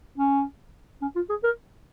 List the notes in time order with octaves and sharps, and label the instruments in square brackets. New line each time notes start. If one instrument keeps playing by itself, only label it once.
[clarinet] C#4
C#4
F4
G#4
A#4